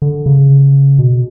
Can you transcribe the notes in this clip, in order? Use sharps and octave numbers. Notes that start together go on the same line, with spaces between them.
D3
C#3
B2